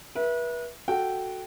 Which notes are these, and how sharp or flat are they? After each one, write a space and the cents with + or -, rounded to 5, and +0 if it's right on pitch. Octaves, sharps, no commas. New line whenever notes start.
B4 -35 E5 +0
F#4 +0 A4 +0 G5 -10